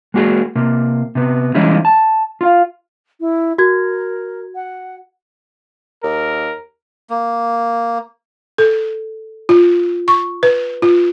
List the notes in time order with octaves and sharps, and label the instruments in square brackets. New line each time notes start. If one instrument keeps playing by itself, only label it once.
[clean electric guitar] G#3 A#3 F#4 G#4
C3 A#3
C3 B3
E3 G3 G#3 C#4 D#4 E4
A5
F4 F5
[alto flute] E4
[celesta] F#4 G#6 [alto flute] A#4
[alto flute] F#5
[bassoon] D#2 [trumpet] A#4
[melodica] A#3
[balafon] A4
F4
C#6
B4
F4